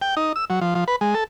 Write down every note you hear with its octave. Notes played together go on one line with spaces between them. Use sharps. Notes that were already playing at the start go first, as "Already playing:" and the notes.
G5
D#4
E6
F#3
F3
F3
B4
G#3
A4